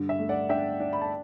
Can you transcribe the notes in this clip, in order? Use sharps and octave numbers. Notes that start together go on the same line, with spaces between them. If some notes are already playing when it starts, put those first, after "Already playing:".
Already playing: G2 D3
E5
A3
D5 F#5
D4 E5 G5
D4
B5
A5